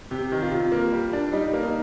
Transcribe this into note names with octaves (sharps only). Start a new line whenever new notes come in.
C3 G4
D#3
F4
C3
A#3
G3
D4
G3 D#4
A#3
D#4